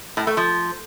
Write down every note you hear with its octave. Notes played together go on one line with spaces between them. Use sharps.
A2
A3
F3